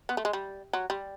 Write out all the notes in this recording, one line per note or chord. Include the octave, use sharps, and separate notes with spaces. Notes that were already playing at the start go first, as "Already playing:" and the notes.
B3
A3
G#3
G3
F#3
G3